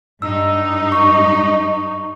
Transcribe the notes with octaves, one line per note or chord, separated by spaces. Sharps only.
G2 D#4 E6
C#6